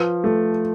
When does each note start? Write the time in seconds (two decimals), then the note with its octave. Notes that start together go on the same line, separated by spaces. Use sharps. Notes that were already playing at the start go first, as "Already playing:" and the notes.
Already playing: F3 B4
0.24 A3